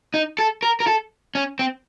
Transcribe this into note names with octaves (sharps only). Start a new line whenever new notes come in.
D#4
A4
A#4
A#4
A4
C#4
C4